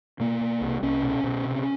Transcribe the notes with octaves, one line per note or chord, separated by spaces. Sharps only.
B2 A#3
B2
C2
C2 C#4
B2
B2
C3